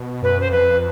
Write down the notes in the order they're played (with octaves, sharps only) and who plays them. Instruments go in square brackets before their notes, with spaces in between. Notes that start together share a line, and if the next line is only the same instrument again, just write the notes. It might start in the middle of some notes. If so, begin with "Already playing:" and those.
Already playing: [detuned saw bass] B2
[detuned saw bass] F#2 [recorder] B4
[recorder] C5
[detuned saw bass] F2 [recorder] B4